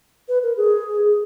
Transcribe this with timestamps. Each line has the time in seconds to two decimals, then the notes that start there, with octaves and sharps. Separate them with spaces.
0.28 B4
0.43 A#4
0.57 G#4